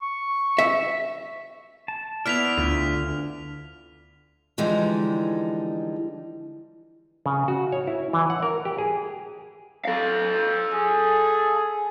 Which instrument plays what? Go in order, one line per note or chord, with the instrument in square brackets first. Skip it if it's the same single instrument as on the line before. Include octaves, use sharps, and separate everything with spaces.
[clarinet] C#6
[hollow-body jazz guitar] E5
[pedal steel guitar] A5
[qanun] B3 E4 C5 [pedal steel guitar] D5 [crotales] F6 B6 F7
[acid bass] D2 [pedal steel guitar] D3 F4
[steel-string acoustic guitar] D3 E3 F3 G3 G#3 D#4
[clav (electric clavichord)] C#3
F#4
C#5
E4
E3
F#5
A#4
G4
G#4
[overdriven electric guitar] A4 F5
[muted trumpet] G#4